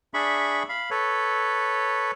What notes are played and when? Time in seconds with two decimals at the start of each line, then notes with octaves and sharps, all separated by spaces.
0.14 D4 G#4 E5 B5 C#6
0.69 F5 B5
0.91 A4 B4 C#5